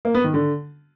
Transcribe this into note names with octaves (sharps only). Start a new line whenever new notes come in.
A#3
B3
D#3
D3